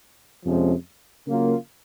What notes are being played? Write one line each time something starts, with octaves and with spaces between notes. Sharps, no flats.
F2 C3 F3 G#3 C#4
C#3 F#3 A#3 F4